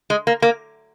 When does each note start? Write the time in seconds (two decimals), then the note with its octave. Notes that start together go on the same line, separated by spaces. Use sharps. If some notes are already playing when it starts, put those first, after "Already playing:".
0.10 G#3
0.27 A#3
0.42 A#3